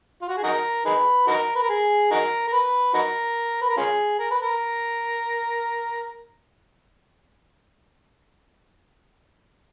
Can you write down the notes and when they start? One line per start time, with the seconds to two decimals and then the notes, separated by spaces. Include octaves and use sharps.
0.21 F4
0.29 F#4
0.37 G#4
0.44 D#4 F#4 A#4
0.85 D#4 G#4 B4
1.27 D#4 F#4 A#4
1.55 B4
1.62 A#4
1.69 G#4
2.11 D#4 F#4 A#4
2.48 A#4
2.53 B4
2.94 D#4 F#4 A#4
3.61 B4
3.69 A#4
3.77 C#4 F4 G#4
4.19 A#4
4.31 B4
4.42 A#4